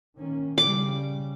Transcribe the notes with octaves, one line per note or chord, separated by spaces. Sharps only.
D#3 A#3 C#4
C#3 G3 D6